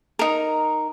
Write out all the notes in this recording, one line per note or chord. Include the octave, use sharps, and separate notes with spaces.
D#4 A#4